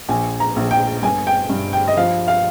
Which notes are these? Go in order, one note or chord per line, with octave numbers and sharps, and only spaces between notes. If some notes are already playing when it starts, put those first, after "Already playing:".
A#1 G#5
A#5
A#1
G5
G1 G#5
G5
G2
G5
D#5
F3 F5
F5